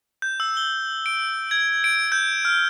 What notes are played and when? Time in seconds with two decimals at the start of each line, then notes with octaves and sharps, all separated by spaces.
0.22 G6
0.40 E6
0.57 G7
1.06 D7
1.51 G#6
1.84 D7
2.12 G6
2.45 F6